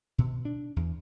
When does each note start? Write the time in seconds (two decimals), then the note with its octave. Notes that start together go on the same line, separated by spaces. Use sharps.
0.18 B2
0.45 D4
0.76 E2